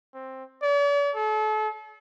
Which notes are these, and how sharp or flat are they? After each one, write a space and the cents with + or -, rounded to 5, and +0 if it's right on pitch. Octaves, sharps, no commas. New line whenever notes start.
C4 +10
D5 -45
A4 -40